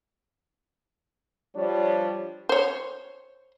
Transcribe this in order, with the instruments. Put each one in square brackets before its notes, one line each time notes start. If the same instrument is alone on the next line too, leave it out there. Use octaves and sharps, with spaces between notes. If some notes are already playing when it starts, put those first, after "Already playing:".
[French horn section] F3 G3 D4 C#5
[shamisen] C5 C#5